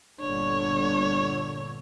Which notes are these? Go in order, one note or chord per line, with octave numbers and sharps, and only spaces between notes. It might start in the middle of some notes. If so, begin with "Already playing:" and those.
G1 A#2 D3 D4 C#5